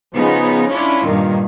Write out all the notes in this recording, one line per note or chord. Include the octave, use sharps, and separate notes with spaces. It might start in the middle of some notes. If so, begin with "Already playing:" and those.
C#3 F3 B3 D#4
C#4 D4 E4 F4
G2 A#2 D#3